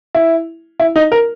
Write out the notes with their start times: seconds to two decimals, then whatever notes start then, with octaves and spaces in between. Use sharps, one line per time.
0.14 E4
0.80 E4
0.96 D#4
1.12 A#4